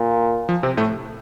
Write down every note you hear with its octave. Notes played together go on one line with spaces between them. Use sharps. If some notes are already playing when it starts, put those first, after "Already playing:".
Already playing: A#2
F3
C3 C4
A2 A3